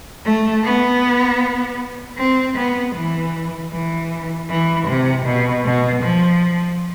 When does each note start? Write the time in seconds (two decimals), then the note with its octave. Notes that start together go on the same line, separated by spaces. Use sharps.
0.25 A3
0.64 B3
2.18 C4
2.56 B3
2.95 E3
3.73 E3
4.50 E3
4.87 C3
5.26 B2
5.65 B2
6.02 F3